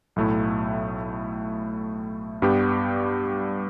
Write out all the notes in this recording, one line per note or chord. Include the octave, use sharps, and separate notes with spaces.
B1 A2 A3 E4
G2 G3 B3 G4